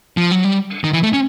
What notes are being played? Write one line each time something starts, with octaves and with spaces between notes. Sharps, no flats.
F3
F#3
G3
D#3
E3
A3
C#4